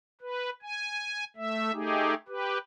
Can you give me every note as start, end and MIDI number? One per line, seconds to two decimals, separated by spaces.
0.21 0.50 71
0.62 1.24 80
1.36 1.72 57
1.36 1.72 76
1.73 2.14 57
1.73 2.14 63
1.73 2.14 67
1.73 2.14 68
2.28 2.58 67
2.28 2.58 71